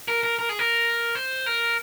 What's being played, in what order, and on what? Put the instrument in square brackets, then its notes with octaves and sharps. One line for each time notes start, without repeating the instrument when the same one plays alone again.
[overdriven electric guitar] A#4
A#4
A#4
G#4
A#4
C5
A#4